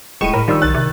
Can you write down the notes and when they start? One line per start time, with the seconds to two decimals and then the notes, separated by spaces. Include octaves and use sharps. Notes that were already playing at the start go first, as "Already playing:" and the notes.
0.21 D#1 A2 G#3 C#6 D#7 E7
0.34 A2 A#4 B5
0.48 D#3 F3 G3 E6
0.62 B1 F#6 A6
0.74 C3